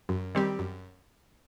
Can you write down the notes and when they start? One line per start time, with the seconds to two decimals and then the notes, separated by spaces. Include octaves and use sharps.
0.09 F#2
0.35 D#3 G3 C4 G4
0.59 F#2